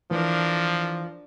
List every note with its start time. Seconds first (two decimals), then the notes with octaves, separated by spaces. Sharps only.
0.11 E3 F3 D4 A#4